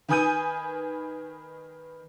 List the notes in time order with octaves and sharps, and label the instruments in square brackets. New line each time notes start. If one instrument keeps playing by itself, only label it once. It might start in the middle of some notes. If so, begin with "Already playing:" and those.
[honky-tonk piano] D#3 B4 G#5 D#6 G6 D#7